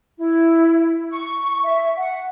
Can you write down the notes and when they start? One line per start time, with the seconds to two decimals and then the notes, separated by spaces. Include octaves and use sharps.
0.19 E4
1.12 C#6
1.64 E5
1.97 F#5